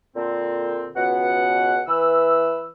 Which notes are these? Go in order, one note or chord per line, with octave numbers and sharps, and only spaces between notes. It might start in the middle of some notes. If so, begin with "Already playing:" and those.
A#2 D3 C4
C#2 B2 F#5
E3 B4 E6